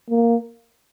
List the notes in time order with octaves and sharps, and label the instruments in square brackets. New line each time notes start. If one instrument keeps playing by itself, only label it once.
[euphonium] A#3